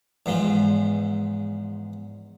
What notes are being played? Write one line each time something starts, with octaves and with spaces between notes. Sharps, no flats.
E2 G#2 F3 G#3